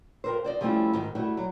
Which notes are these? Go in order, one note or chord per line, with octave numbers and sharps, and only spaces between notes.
F2 A#4 C5
C5 D5 D#5
F3 G3 A3 C4 C#4 E4
G#2 D#3
G3 A3 E4 F#4
F#3